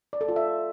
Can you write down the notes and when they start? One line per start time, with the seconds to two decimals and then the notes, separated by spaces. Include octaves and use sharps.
0.13 D5
0.21 A4
0.28 F4
0.36 E5